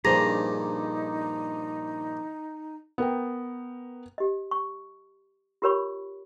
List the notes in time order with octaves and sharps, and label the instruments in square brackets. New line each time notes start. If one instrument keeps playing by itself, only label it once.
[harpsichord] A#1 G2 [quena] D#4 [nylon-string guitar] G#4 C5 [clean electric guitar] A#5
[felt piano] B3 A#4 G5
[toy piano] G4 D#5
C#6
F4 G4 A#4 C#5 B5 C#6